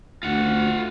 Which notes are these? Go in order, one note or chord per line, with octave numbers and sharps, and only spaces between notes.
D2 F4 F#5